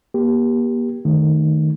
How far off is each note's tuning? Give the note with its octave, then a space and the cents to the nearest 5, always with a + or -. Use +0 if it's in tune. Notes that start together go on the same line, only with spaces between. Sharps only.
A#3 +35 G4 +0
D#3 -10 A3 +0